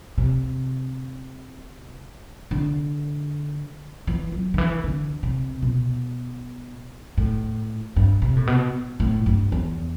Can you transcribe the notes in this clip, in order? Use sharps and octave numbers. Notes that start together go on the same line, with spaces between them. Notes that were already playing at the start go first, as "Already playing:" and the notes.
C3
D3
E3
F#3
D3
E3
D3
C3
B2
A2
G2
C3
A2
B2
A2
G2
E2